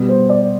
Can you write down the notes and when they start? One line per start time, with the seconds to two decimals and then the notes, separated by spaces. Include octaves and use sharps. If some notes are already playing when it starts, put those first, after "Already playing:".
Already playing: B2 G3 B3
0.09 C5
0.29 D5